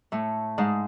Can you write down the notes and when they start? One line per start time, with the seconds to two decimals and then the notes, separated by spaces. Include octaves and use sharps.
0.12 A2 A3
0.58 G#2 G#3